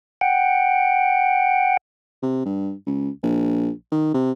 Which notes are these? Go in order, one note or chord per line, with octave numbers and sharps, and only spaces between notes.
F#5 G5
C3
G2
C#2
A#1
D#3
C3